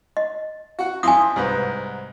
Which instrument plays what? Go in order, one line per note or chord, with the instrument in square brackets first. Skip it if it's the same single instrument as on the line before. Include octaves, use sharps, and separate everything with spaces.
[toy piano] D#5
[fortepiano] F#4 F#5
[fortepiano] F2 E4 C6 [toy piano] G#5 D#6
[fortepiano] C2 G#2 B4